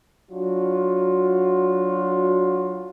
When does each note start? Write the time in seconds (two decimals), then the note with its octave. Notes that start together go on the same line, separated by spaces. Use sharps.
0.31 F#3 D4 F4 F#4